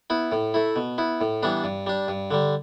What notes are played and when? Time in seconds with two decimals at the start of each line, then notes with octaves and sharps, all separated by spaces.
0.10 B3 E4
0.32 A2
0.54 A3 E4
0.76 B2
0.98 B3 E4
1.21 A2
1.43 E3 G3 B3 D4
1.64 G2
1.87 G3 D4
2.08 G2
2.31 D3 G3